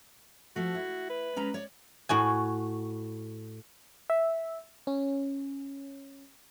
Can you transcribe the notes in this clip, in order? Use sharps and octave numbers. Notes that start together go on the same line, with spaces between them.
F3 A3 F#4
E4
B4
G#3 C#4 A#5
C#5 D5
A2 F#4 G#5
E5
C#4